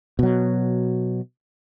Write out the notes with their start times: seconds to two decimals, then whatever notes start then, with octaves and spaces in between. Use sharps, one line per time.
0.19 B2 F#3